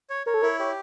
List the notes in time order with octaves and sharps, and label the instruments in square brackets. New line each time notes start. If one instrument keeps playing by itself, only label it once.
[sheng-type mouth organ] C#5
[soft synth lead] A#4 [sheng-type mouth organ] C#5
[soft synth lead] A4
[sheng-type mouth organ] E4 [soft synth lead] A#4
[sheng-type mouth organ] G4 [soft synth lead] C#5